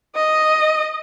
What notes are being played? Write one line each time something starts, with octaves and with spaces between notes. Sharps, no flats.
D#5